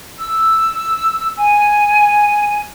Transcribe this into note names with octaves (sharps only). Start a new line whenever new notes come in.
E6
G#5